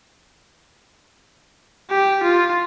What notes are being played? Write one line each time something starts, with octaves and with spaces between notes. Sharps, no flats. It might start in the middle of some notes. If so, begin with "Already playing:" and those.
G4
F4